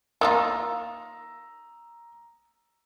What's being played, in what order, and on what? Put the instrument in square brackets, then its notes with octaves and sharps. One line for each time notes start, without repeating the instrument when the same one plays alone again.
[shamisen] A#3 D#4 F4 [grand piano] A#5 D#6 E6